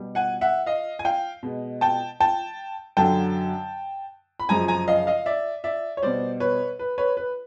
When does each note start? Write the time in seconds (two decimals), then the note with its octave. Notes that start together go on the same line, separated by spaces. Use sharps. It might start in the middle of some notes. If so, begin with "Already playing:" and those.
Already playing: B2 G3
0.15 F#5 G#5
0.41 E5 F#5
0.66 D#5 F5
0.99 G#5
1.05 F5 G5
1.43 B2 G#3
1.81 G5 A5
2.20 G5 A5
2.97 F#2 D3 F#3 G5 A5
4.40 B5
4.49 F#2 C#3 F3 G#3 G#5 A#5
4.68 G#5 A#5
4.88 D#5 F5
5.07 D#5 F5
5.26 D5 E5
5.64 D5 E5
5.97 C#5
6.02 B2 G3 C5 D5
6.40 B4 C#5
6.79 B4
6.98 B4 C#5
7.17 B4